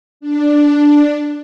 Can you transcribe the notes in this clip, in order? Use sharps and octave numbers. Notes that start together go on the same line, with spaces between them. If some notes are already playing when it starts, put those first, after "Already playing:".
D4